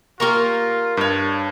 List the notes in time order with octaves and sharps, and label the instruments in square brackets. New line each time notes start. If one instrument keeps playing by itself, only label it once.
[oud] A#3 G4 [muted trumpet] F4 [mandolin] A#5 C#6 F6
[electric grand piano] G2 [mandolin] D4 C#5